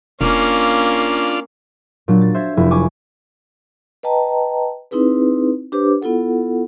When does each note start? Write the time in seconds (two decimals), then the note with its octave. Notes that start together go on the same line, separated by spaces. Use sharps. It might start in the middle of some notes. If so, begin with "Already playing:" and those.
0.21 E1 A#3 C#4 D4 F4
2.08 A#2 F#3 D4
2.21 A6
2.34 C5 E5 G#6
2.57 F1 E4 C5
2.71 G#5 C#6 D6
4.03 B4 D#5 G5 A5 A#5
4.91 C4 D#4 E4 G#4 B4
5.72 D4 G4 B4 C5 D6
6.02 B3 E4 F4 A4 F#5